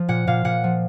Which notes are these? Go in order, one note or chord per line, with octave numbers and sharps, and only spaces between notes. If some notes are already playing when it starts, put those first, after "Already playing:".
Already playing: F3
A#2 F#5
A#2 F5
A#2 F#5
F3